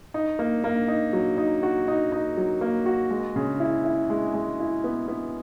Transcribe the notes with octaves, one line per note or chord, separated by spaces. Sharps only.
D#4
A#3
A#3
D#4
F#3
D#4
F#4
D#4
D#4
F#3
A#3
F#4
G#3
C#3
E4
E4
G#3
G#3
E4
B3
B3